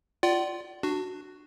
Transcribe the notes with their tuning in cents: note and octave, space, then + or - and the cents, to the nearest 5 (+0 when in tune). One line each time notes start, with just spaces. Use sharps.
F4 +0 D5 +0 F#5 +45
D4 +20 F#4 +0